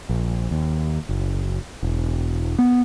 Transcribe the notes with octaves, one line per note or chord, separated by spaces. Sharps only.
A#1
D#2
F#1
E1
B3